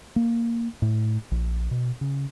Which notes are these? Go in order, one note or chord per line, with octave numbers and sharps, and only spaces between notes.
A#3
A2
A#1
B2
C#3